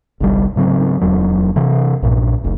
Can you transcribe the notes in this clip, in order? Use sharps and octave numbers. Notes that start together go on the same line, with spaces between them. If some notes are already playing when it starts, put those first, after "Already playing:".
G1 C2 G3
G#2 C#3 F#3 C4
D1 E2 F#3
C3 E3
A#1 G2 A#2
F1 C2